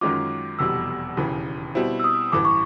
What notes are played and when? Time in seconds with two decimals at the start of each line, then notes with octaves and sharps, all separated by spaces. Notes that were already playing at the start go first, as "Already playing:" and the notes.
0.01 F#2 D#3 G#3 C#4 F4 D6
0.59 F1 E2 B2 G3 E6
1.17 E1 D#2 C#3 E3
1.75 B2 G3 C4 E4
2.00 E6
2.04 D#6
2.32 A1 G2 E3 D6
2.45 C#6